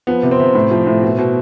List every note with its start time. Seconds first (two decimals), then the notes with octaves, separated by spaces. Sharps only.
0.07 F3 B3
0.23 C3
0.31 C4
0.40 C3
0.55 A2
0.71 F3
0.87 A2
1.03 B2
1.18 B2